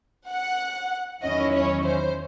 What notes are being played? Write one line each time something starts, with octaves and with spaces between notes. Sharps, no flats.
F#5
E2 D#3 F#3 C#4 E4 D#5
C#5
C5